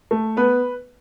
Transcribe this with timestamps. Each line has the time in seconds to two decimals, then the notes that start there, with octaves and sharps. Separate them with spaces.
0.11 A3
0.37 B3 B4